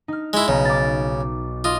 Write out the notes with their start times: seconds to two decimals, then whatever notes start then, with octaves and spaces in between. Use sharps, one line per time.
0.08 D#4 F6
0.33 G#3 E4
0.48 B1 C#3 A#5
0.65 D6 A6
1.64 F4 D#5 D#6